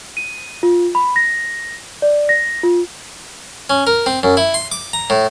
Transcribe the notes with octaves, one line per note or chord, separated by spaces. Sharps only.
D#7
F4
B5
A#6
D5
A#6
F4
C#4
A#4
C4
F#2
E4
C6
D6
A#5
A2